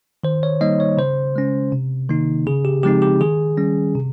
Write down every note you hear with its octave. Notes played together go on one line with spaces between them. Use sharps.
D#3 C5
C#5
G3 A#3 D#4 D#5
C#5
C#3 C5
G#3 C#4
C3
D#3 A#3 D#4
C#3 G#4
G4
F3 G#3 C4 D#4 G4
G4
D#3 G#4
G3 C#4
C3